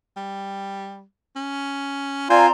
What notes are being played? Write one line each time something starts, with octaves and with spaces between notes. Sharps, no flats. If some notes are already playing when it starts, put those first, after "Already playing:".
G3
C#4
C4 F4 D5 G#5 A#5 C6